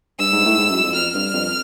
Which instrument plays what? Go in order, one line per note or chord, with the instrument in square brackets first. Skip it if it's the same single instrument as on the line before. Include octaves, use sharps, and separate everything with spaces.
[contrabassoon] G2 [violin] E6
[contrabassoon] G#2
A2
G#2
F#2
F2
[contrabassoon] F2 [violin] F6
[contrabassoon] G2
F2